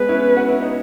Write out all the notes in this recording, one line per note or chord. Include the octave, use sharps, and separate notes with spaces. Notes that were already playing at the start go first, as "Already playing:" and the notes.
Already playing: G#3 B3 B4
C#4 E4
F#4
E4
D#4